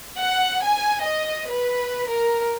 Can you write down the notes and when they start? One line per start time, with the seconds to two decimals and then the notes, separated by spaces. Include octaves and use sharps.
0.19 F#5
0.63 G#5
1.02 D#5
1.51 B4
2.09 A#4